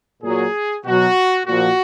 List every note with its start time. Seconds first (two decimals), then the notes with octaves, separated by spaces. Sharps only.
0.23 A#2 F#3 G#4
0.85 B2 F#3 F#4
1.46 A#2 F3 F#4